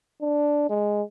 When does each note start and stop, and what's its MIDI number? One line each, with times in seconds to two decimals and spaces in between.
0.21 0.66 62
0.70 1.02 56